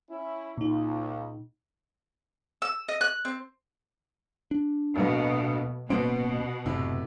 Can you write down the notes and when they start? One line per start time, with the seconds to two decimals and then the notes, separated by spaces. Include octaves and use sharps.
0.10 C#4 E4
0.58 C#2 A#2 D#4
2.62 E6
2.89 D#5
3.01 F#6
3.25 C4
4.51 D4
4.96 D1 B2 A#3
5.90 D1 B2 A#3 B3 C#4 C5 D7
6.66 F#1 A2 C3 E4